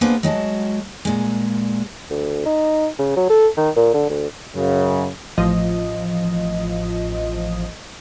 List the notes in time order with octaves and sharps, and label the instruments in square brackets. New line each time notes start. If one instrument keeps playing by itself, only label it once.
[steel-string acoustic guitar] A#3 B3 D4 G#4 B4 C5
F#3 G#3 F#4 A5
A#2 G#3
[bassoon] D2
D#4
C#3
F#3
A4
D#3
A#2
D3
D2
[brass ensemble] F#2 C#3
[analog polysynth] A1 F3 D#5